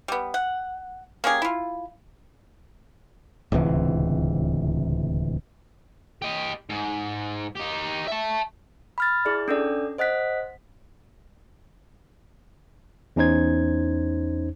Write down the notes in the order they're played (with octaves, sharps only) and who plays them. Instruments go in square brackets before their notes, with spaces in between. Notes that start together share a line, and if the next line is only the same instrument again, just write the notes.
[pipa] G3 B3
F#5
A#3 C#4 G4 G#4
E4 F4
[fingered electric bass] D1 C#2 C3 E3
[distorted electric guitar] G4 D#5
G#2
D#4 G4
E5 A5
[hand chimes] B5 F6 A6
E4 G#4 D5
C#4 D4 A4 D5
C5 D#5 F#5 F#6 B6
[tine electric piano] E2 C#4 D#4 C5 G#6